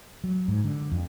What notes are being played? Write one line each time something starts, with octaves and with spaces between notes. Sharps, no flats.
F#3
G#2
D3
F2